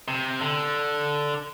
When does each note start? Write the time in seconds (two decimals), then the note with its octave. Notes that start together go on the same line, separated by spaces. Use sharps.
0.08 C3
0.41 D3